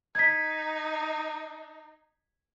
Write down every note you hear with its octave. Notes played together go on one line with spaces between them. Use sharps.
D#4 G#6 B6